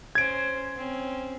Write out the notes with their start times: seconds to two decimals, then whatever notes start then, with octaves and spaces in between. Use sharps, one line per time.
0.15 C#4 C5 G#6 D7
0.77 C4 C#4